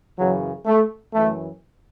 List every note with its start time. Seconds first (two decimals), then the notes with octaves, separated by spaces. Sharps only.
0.17 F#2 C#3 E3 F#3
0.66 A3
1.13 F#2 E3 A3